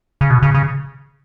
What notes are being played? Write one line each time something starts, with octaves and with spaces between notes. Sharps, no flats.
C#3
B2
C#3
C#3